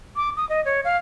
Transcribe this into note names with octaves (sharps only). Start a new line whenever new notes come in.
D6
D#6
D#5
C#5
F5